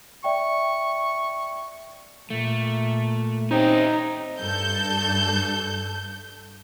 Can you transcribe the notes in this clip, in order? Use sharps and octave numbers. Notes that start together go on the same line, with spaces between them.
D5 E5 G5 C#6
A#2 A3
C4 C#4 D#4 G4
G2 A4 G6